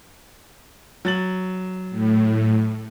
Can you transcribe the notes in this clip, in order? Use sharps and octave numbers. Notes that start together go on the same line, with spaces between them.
F#3 A6 F#7
A2